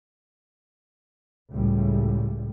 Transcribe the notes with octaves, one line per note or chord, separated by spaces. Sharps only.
C#2 A2 G3